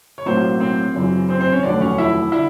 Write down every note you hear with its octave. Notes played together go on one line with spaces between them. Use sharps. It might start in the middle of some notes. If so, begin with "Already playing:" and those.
C#5
B1 A2 F#3 A#3 C4 C5
C4 C5
F#2 C#3 E3
C4 C5
C4 C5
C#4 C#5
F1 D#2 D3 F#3 A3 D4 D5
C#4 C#5
E4 E5
D3 G3 E4 E5